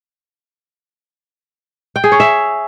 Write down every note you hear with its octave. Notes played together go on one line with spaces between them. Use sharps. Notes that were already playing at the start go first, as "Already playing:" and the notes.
G5
G#4
C#5
E5